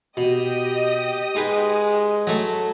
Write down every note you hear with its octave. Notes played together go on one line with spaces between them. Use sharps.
B2 G4 D#5 D#6
G#3 D#4 G#4 B4
F#3 A3